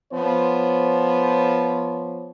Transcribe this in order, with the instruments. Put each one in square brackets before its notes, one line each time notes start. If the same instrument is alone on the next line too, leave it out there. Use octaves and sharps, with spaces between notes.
[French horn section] F3 B3 C5 C#5